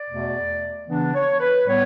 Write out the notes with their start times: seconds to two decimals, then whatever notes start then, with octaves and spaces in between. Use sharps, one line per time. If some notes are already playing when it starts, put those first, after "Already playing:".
Already playing: D5
0.10 E2 B2 A3
0.88 C#3 E3 B3 D4
1.14 C#5
1.40 B4
1.67 A2 G3 B3 C#5